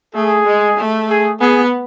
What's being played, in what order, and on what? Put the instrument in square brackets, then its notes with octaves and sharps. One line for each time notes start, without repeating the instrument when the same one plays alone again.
[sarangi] A3 [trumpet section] G#4
[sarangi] G#3
A3
[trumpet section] G#4
[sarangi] B3 [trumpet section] G#4